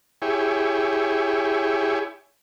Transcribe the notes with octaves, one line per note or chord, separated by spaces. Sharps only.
E4 G4 G#4 C#5